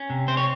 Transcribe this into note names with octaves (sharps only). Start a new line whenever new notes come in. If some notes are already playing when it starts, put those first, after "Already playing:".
Already playing: C#4
C3
C4 C5
C#5